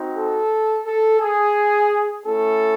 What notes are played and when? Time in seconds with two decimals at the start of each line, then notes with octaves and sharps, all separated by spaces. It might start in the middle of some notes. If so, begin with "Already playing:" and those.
Already playing: C4 D#4 F#4
0.15 A4
0.86 A4
1.20 G#4
2.25 A3 C#4 E4 A4